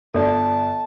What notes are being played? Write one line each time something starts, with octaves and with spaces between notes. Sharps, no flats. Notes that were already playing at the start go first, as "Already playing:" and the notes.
G1 F4 A4 D5 A5